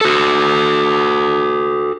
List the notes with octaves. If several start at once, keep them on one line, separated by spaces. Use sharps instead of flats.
F#4 A4